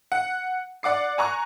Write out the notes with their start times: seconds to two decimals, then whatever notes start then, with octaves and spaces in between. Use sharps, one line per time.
0.12 F#5
0.83 D5 F#5 D6 C7
1.18 G#5 A#5 C#6 F#6